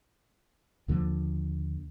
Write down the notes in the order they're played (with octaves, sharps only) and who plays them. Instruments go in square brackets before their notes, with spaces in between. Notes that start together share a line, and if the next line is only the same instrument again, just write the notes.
[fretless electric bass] D#2 D3 F3 A#3